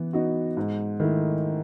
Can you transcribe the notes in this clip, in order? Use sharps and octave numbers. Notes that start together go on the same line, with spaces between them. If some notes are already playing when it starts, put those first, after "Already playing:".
Already playing: E3 B3
B3 D#4 F#4
G#2
D#3 A3 E4